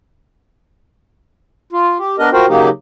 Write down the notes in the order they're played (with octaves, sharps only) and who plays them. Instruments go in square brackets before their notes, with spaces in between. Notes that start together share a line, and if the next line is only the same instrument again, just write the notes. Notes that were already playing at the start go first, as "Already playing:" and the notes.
[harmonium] F4
G4
B3 D4 A#4 D#5
F4 F#4 A#4 C5 G5
C#3 F#3 A#3 D#4 G4